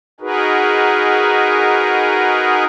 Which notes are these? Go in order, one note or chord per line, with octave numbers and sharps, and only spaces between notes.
D#4 F#4 G#4 A#4 B4